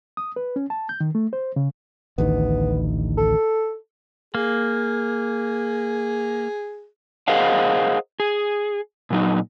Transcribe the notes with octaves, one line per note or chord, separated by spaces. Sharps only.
D#6
B4
C#4
A5
G6
D#3
A3
C5
C#3
A1 D2 D#3 B3
A4
A#3 G#4
G#4 A#4 C5 D#5 F5 F#5
G#4
A#2 F#3 D#4